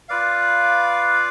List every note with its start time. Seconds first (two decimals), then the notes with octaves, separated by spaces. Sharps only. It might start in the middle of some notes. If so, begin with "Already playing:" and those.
0.09 F4 B4 D5 F5